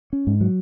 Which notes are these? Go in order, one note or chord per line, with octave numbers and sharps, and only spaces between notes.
C#4
G#2
F#3